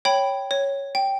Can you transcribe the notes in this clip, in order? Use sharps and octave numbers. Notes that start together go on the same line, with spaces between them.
C#5 G5 B5
C#5
G5